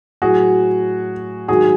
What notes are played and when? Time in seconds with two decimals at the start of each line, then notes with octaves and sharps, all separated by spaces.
0.22 A2 F#3 F#4 G#4
1.48 G#2 D#3 F#3 F#4 G#4